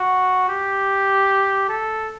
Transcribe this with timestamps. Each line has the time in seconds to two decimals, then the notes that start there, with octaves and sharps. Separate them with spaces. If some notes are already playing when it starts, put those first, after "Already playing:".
Already playing: F#4
0.49 G4
1.69 A4